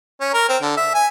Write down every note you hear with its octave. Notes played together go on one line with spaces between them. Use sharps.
C#4
A#4
C4
D3
E5
G#5